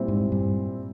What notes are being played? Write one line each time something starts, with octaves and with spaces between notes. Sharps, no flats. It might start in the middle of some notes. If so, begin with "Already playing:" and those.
Already playing: A#2 G3 C4 E4
G#2
G2